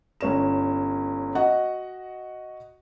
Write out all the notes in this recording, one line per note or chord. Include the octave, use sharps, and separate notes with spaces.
G1 C#4 E7
F#4 D#5 F#5